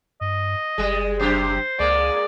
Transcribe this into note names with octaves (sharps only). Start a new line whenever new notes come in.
G2 D#5
F#1 G3 G#3
F#2 C3 G4 C5
C#2 G#3 A#3 D5